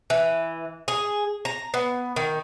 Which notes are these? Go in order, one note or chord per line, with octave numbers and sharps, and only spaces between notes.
E3
G#4
A#5
B3
D#3